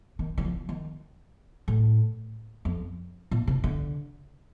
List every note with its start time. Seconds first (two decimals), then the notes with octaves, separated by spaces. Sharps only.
0.19 D#3
0.38 D#3
0.45 F3
0.69 D#3
1.68 A2
2.65 F2
3.31 A#2
3.47 C3
3.64 D3